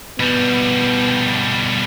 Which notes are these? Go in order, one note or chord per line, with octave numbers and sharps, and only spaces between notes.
B2 G3 B3